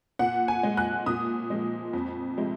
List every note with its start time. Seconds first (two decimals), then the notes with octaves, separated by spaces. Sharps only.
0.19 A#2 F#5
0.48 G#5
0.63 G#3
0.77 F#6
1.06 A#2 D#6
1.50 F3 G#3
1.93 F2
2.37 C3 F3 G#3